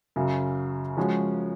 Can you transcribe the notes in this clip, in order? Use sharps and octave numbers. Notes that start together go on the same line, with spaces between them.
F#2 C#3 F#3
F3 G#3 C#4 F#4